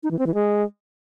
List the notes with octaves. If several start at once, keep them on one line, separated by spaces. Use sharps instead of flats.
D#4
E3
C4
E3
G#3